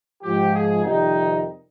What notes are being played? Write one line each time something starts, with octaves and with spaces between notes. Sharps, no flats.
G#2 F3 G4
G#4
F2 C3 D#3 G3 D#4